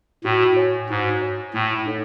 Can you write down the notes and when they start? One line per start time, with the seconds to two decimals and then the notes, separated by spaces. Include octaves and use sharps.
0.24 A2 F#4
0.56 C#5 G#5
0.90 G#2 F#4
1.21 C#5 G#5
1.54 A2 A3
1.86 D#4 A4 C#5 F#5